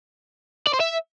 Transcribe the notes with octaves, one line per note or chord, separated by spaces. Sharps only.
D5
C5
E5